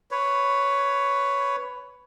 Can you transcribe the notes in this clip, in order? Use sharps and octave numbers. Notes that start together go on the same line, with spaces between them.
B4 C#5